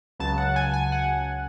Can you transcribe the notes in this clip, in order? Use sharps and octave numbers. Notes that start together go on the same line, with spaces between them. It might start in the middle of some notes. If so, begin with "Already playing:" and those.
C#2 C#3 F#3 A5
F#5
G#5
G#5
F#5